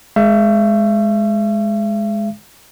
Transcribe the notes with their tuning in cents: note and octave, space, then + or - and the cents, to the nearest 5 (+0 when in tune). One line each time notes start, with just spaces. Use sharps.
G#3 +10 E5 +40